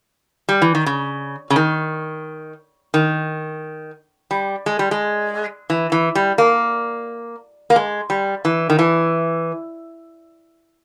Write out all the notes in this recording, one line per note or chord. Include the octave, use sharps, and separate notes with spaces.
G3
E3
D#3
C#3
C#3
D#3
D#3
G3
G#3
G3
G#3
E3
E3
G3
A#3
A#3
G#3
G3
E3
D#3
E3